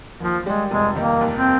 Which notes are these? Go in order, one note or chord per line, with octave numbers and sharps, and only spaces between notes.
D#2 F3
G3 G#3
F1 G#3
D#3 A#3
D#2
C4